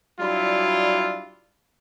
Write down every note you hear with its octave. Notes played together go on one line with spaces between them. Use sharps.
F#3 G3 D4 E4 F4